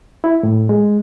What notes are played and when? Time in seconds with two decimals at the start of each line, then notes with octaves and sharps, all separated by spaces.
0.24 E4
0.43 A2
0.69 G#3